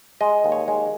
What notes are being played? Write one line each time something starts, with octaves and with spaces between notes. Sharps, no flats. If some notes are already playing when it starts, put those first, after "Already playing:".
G#3 D#5
D#2
C#5
G#3